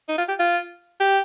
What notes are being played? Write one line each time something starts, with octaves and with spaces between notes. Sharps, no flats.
D#4
F4
G4
F4
G4